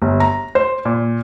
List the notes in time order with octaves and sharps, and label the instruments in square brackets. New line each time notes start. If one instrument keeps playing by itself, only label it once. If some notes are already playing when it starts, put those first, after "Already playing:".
[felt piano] G1
A#5
C5
A#2